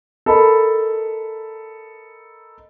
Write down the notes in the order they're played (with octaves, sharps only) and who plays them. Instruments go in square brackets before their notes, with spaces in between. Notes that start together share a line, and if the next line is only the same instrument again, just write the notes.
[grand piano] A4 A#4 D#5 A5 B5